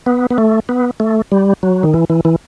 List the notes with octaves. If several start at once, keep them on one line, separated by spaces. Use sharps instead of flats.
B3
B3
A3
B3
A3
G3
F#3
D#3
E3
E3
E3